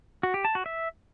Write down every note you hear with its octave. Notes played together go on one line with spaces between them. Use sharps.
F#4
G4
A5
F#4
E5